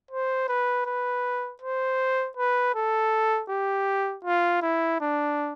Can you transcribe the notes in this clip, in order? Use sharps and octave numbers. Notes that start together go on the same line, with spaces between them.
C5
B4
B4
C5
B4
A4
G4
F4
E4
D4